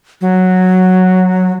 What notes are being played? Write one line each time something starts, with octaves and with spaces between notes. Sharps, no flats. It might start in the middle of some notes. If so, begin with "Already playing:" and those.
F#3